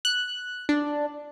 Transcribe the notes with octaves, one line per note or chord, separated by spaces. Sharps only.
F#6
D4